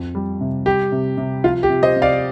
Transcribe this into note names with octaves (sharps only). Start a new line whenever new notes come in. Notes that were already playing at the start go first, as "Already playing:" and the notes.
Already playing: F2
G3
C3
G3 G4
C3
C3
F3 F4
G4
C3
C5 D#5
C3
D5 F5